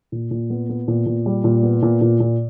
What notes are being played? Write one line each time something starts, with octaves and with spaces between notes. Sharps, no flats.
A#2
A#2
B3
B3
A#2
A#2
G3
A#2
B3
A#2
A#2
A#2